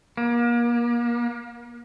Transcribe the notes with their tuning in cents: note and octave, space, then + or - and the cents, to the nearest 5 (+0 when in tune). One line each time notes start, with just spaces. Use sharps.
A#3 +35